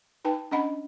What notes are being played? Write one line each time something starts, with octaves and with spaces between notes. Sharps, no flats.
D#4 B4 G5 A5
C#4 D4 D#5 F#5 B5